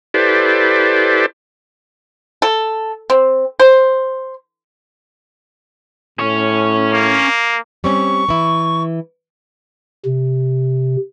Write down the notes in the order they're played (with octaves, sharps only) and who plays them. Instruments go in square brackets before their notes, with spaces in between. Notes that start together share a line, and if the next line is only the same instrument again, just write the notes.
[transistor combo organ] E4 G4 A4 B4 C5 D5
[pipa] A4
C4
C5
[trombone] A2 [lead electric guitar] C#4 C#5
[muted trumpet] A#3
[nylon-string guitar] G3 C4 C#4 [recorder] C#6
[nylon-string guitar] E3 E4
[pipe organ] C3